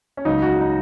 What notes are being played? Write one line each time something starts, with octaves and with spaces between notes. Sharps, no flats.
C#4
C#2 C#3 F#3 D#4
F#4
D#4